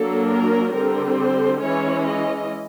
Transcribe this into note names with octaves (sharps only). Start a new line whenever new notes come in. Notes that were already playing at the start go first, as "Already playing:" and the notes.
Already playing: F#3 A#3 D4 A4
A#4
D3 G3 C4 A#4
C5
E3 G#3 C#4 C#5
D#5